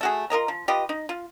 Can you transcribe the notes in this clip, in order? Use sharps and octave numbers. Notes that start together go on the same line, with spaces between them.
A3 F#4 G#4
F4 A#4 D#5 A#5
F3
F4 G4 B4 D#5
D#4
F4